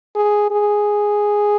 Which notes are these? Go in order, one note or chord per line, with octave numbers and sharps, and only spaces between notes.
G#4
G#4